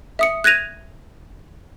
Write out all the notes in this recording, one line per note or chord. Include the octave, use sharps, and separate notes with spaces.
E5 D#6 C#7
F#6 G#6 A#6 D#7 F7